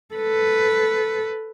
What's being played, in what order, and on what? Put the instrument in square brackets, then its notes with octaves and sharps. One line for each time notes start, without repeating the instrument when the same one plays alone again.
[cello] A4 B4